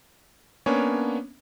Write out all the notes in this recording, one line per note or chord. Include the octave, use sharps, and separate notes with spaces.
A#3 B3 C#4 D4 C#5 G#5